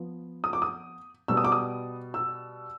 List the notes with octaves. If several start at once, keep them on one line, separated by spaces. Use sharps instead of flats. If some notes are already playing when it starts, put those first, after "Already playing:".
Already playing: F3 B3
D#6
D6
D#6
B2 G3 B3 E6
D#6
D6
D#6
E6